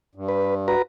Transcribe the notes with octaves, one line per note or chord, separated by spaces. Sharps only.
G2
B4
F#4 B4 A#5